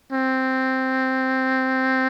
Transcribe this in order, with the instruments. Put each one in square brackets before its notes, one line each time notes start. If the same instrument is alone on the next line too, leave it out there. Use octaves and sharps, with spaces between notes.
[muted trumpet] C4